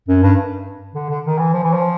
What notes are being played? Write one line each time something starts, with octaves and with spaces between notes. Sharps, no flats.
F#2
G2
D3
D3
D#3
E3
F3
E3
F3